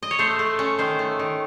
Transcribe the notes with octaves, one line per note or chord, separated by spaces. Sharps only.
D#5
C#5
A3 C5
A3
C#4
D#3 C5
A3
D#3